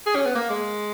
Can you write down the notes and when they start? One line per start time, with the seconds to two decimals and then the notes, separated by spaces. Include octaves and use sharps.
0.06 G#4
0.15 C#4
0.26 B3
0.35 A#3
0.50 G#3